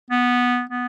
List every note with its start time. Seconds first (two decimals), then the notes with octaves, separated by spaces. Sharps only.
0.10 B3
0.69 B3